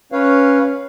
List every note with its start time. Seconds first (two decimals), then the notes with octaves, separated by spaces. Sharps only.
0.12 C#4 B4 C#5 F5